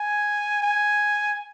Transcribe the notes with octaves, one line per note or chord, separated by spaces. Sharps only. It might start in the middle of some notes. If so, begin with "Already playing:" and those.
Already playing: G#5
G#5